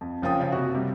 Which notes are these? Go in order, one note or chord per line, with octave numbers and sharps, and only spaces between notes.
F2
F#1 F3 C#4 G5 D#6
C#3
C3 F#4
C3 G3